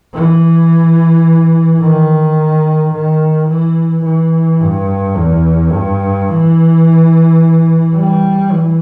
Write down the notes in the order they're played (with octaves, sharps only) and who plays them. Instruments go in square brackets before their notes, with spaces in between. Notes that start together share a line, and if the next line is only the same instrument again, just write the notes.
[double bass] E3
D#3
D#3
E3
E3
G2
E2
G2
E3
G3
E3